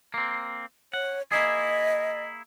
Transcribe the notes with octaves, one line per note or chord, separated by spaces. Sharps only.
A#3 C4
C#5 F#5
A#3 E4 G#4 D#5